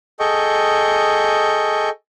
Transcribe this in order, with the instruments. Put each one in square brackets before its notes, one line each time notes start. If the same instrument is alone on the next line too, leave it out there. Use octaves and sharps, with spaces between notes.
[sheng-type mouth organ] G#4 A4 D#5 G5 C#6